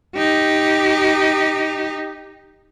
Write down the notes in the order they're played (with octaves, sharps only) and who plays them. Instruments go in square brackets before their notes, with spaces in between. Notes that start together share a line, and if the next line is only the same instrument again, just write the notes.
[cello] D#4 G4